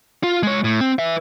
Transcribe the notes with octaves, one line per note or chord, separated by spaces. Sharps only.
F4
G#3 C#5
A2
C4
B4 E5